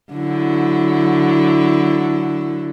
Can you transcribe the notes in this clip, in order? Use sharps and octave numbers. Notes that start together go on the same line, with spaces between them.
D3 F#3 E4